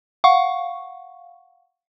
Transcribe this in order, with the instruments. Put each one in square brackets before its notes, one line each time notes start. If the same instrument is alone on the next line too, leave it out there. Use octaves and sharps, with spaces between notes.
[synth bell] F5 F#5 C#6